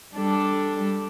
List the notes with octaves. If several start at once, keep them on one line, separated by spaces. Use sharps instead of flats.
G3 D4 A4